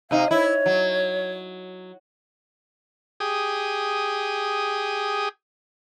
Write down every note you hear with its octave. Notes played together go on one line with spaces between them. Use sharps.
C3 D#4 F5
E4 C#5
F#3
G4 G#4 D#6